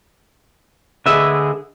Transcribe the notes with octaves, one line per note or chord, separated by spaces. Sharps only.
D2 D3 G#3 G#4 B4 E5